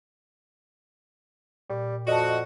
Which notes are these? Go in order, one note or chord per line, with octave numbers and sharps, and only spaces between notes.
A#2 G3
F2 F#4 D5 D#5 A5